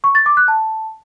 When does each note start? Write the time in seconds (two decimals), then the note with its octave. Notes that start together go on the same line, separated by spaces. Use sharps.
0.04 C#6
0.15 A6
0.26 D6
0.37 F#6
0.48 A5